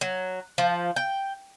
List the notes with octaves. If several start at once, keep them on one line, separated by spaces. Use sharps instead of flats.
F#3
F3
G5